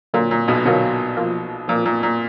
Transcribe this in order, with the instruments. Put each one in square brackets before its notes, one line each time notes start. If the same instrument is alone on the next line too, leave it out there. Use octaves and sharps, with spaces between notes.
[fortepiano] A#2 [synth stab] D3 F#3 A#3 F4
[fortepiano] A#2
B1 B2
[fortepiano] B1 B2 [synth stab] D3 F#3 A#3 F4
[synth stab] F3 A#3 F4
[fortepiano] A#2 [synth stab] F3 A#3 F4
[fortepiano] A#2
A#2